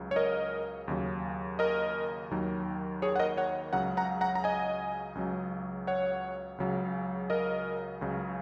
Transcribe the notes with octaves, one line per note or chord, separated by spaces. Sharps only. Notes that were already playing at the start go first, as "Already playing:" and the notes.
Already playing: C#2 C#3 F#3
C#5
A#4 D#5
D#2 C#3 F#3
A#4 D#5
D#2 D#3 F#3
G#4 C#5
F#5
A#4 D#5
C#5 F#5
C#2 C#3 F#3 F#5 A#5
F#5 A#5
F#5 A#5
A#5
D#5 G#5
C#2 C#3 F#3
C#5 F#5
C#2 C#3 F#3
A#4 D#5
C#2 C#3 F#3